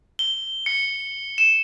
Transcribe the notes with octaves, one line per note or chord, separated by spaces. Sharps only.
G7
C#7
E7